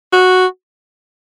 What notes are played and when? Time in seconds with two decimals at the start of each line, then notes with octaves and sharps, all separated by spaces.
0.13 F#4